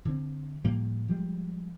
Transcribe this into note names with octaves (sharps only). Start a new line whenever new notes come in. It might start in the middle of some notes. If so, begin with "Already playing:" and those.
D3 C4
A2 F3 G3 A#3
F3 G3 G#3